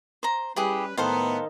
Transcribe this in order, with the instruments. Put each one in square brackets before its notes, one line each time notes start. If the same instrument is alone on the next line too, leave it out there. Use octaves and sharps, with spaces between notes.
[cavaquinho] C5 A#5
[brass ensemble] G3 C#4 B4 [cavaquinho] E4 G4 G#4
[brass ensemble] A2 B3 [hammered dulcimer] D#3 [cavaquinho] A4 C5 F5